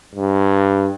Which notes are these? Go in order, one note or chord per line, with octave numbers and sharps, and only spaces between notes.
G2